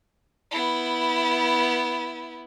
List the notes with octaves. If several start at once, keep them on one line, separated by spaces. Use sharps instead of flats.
B3 E4